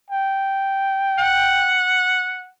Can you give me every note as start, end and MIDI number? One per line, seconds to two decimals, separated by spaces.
0.10 1.76 79
1.18 2.48 78